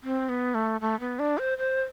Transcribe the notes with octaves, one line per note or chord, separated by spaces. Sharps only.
C4
B3
A3
A3
B3
D4
C5
C5